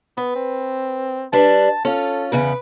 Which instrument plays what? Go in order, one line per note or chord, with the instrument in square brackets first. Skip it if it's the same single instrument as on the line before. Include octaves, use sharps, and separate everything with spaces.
[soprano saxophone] B3 [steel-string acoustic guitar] B4
[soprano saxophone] C4
[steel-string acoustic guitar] G3 D4 B4 [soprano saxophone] A5
[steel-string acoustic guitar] C#4 F4 [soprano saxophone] A4
[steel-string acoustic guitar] E2 C#3 B3 [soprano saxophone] B4